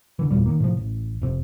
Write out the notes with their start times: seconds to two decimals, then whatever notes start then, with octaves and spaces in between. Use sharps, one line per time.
0.19 D3 E3
0.31 F1 E2 A#2 G3
0.46 D#3 A#3
0.60 A2 C3 F3
0.77 A1
1.22 F1 C3